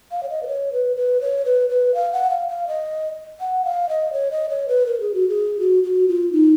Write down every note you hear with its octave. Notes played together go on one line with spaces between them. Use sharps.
F5
C#5
D#5
B4
C#5
B4
B4
C#5
B4
B4
F5
F#5
F5
F5
D#5
F#5
F5
D#5
C#5
D#5
C#5
B4
A#4
G#4
F#4
G#4
F#4
F#4
F4
D#4